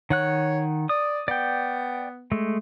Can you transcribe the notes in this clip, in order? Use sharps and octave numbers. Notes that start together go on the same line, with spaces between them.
D#3 C#5 F#5 F#6
D5 D#6
B3 D5 G5
G#3 A3